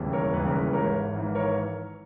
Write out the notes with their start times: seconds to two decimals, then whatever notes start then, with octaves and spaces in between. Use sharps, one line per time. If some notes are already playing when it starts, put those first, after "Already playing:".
Already playing: E1 D#2 C#3 E3 G3
0.13 A#4 C#5
0.33 E1 D#2 C#3 E3 G3 B4
0.47 A#4
0.60 B4
0.73 G#1 G#2 E3 A#4 C#5
1.14 G#1 G#2 E3
1.35 A#4 C#5